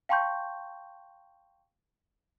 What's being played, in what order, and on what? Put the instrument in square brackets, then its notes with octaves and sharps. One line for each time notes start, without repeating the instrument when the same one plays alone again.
[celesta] F5 G5 A5 C6 C#6 G6